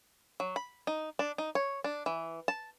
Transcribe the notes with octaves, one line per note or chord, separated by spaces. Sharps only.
F#3
B5
D#4
D4
D#4
C#5
D4
E3
A5